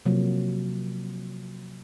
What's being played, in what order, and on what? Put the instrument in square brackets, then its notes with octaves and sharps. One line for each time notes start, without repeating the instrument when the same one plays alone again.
[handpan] C3 F3 F#3 A#3